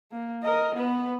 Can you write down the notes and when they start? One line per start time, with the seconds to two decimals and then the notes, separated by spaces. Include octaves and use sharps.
0.12 A#3
0.43 A#4 D#5
0.75 B3 B4